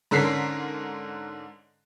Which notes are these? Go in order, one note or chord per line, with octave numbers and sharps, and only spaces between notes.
G#2 D3 C#4 A#4 B6 C7